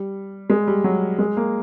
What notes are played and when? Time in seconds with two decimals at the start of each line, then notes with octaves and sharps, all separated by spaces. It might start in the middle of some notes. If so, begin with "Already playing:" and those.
Already playing: G3
0.50 G#3
0.67 G3
0.84 F#3
1.19 G#3
1.37 A#3